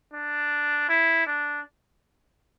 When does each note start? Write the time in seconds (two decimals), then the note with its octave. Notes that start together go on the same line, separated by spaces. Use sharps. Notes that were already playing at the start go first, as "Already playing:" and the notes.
0.13 D4
0.89 E4
1.27 D4